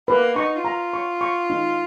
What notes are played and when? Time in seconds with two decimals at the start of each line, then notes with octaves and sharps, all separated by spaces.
0.08 A#3 B4
0.36 D#4 C#6
0.65 F4 A#5
0.93 C#6
1.21 C#6
1.50 D#4